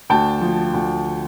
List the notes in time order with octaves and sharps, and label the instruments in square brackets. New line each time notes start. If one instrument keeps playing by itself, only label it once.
[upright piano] D2 G5 A5
F3
D2